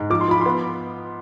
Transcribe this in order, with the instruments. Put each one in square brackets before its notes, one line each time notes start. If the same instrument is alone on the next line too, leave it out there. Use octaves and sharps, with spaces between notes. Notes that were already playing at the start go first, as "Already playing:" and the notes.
Already playing: [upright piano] G#2
F3 D6
C6
F3 B5
B3 C6